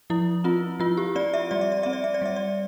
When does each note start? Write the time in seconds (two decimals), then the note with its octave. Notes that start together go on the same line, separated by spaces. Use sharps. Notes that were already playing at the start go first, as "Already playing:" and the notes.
0.10 F3 E4
0.44 C4 F4
0.80 F3 F4
0.97 G4
1.15 C4 D5
1.34 E5
1.51 G3 D5
1.61 E5
1.72 D5
1.83 C4 E5
1.93 D5
2.04 E5
2.14 D5
2.22 G3 E5
2.36 D5